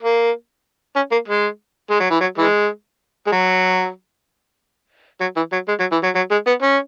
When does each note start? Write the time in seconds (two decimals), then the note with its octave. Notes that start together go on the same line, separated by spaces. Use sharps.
0.02 A#3
0.96 C#4
1.12 A#3
1.28 G#3
1.91 G#3
2.00 F#3
2.11 E3
2.21 F#3
2.38 E3 G#3
3.27 G#3
3.32 F#3
5.21 F#3
5.36 E3
5.52 F#3
5.68 G#3
5.80 F#3
5.92 E3
6.04 F#3
6.15 F#3
6.31 G#3
6.47 B3
6.63 C#4